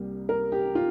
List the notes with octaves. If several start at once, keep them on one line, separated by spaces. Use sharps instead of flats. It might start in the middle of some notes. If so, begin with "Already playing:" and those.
Already playing: C2 C3 G3 A#3
A#4
G4
F4